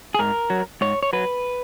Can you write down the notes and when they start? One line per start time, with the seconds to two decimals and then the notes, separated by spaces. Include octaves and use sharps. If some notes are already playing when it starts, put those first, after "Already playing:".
0.14 G#4
0.19 G#2 A#4
0.50 F#3
0.81 G#2 C#5
1.03 C#5
1.13 F#3 B4